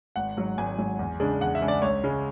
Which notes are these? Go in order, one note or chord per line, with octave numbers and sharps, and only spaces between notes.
G#1 F#5
G#2 F#3
G#1 G#5
G#2 F#3
E2
C#3 G#3 D4
E2 F#5
E5
C#3 G#3 D4
D5
C#2 C#5
C#3 G#3